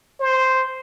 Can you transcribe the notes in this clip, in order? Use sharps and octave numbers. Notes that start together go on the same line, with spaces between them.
C5